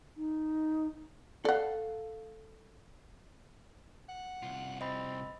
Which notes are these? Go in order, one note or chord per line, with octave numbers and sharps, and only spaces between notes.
D#4
A4 D5 F5 F#5
F#5
C2 F4
C4 D#5 B5